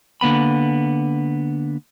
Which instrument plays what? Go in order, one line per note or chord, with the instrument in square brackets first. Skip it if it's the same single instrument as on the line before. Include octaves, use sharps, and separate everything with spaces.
[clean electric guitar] D3 A#3 B3 B5